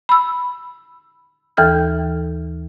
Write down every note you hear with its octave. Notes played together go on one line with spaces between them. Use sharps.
B5 E6
D#2 E3 A4 F6 G6